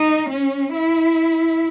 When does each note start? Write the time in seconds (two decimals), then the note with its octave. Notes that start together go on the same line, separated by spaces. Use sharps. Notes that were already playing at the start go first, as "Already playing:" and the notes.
Already playing: D#4
0.31 C#4
0.73 E4